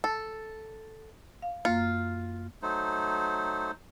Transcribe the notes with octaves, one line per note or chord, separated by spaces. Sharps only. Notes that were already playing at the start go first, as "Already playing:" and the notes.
A4
F5
F#2 A#3 F4
F#3 A3 D#4 C5